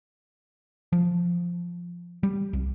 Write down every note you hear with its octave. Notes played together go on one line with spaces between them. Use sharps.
F3
G3
C2